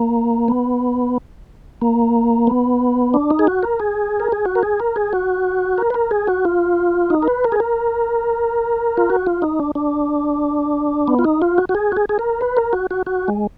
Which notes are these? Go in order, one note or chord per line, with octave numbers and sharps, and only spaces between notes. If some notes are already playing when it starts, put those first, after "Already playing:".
Already playing: A#3
B3
A#3
B3
D4
D#4
G#4
F#4
A#4
G#4
A#4
G#4
F#4
A#4
G#4
A#4
G#4
F#4
A#4
B4
A#4
G#4
F#4
F4
D#4
A#4
B4
A#4
G#4
A#4
F4
F#4
F4
D#4
D4
D4
B3
F4
D#4
F4
F#4
F#4
G#4
F#4
G#4
G#4
A#4
B4
A#4
F#4
F#4
F#4
G#3